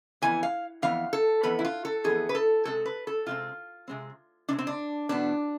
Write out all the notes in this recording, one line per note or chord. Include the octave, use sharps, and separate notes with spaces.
F2 E3 B3 G#5
F5
F2 E3 B3 F5
A4
F2 E3 B3 B4
E4
F4
A4
F2 E3 B3 G#4
B4
A4
C3 G#3 C4 A4
B4
A4
C3 G#3 C4 F4
C3 G#3 C4
C3 G#3 C4 D4
C4
D4
E2 B2 B3 D4